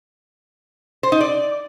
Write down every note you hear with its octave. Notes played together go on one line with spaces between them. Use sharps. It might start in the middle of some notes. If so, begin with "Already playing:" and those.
C5
D#4
D5